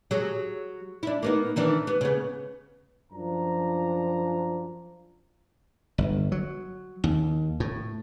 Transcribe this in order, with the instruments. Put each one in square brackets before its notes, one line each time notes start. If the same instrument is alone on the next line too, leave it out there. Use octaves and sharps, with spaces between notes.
[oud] F#3 G#4
D4 E4
A#3 B3 D#4
D#3 E3 D4
B3
C#3 B3
[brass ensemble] F#2 F3 D4 A#5
[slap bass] G1
F#3
D#2
A2